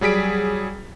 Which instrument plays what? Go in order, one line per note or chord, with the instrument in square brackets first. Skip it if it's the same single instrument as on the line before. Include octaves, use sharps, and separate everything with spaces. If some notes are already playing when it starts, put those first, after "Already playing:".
[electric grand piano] F#3 G3 G#4 B6 D7